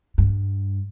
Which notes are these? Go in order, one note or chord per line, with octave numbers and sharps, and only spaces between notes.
G2